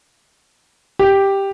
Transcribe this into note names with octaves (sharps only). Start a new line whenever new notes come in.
G4